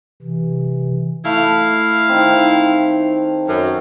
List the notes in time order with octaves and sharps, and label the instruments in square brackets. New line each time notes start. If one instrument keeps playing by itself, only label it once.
[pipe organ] C3 E3
[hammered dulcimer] A3 [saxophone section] E4 F5
[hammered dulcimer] D#3 C4
[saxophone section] F#2